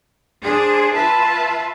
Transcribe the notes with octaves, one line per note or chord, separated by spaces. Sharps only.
D4 G#4 C5
F4 B4 E5 A5